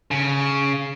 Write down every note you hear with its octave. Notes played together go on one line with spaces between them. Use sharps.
C#3